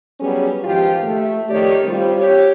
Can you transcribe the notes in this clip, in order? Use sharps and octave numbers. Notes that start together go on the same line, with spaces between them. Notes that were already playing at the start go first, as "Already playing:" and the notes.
F#3 G3 B3 C#4 G#4
G#2 D#3 F3 F4 G4
A3
F2 D#3 A3 G4 C#5 D5
G3 C4 F4
G4 C#5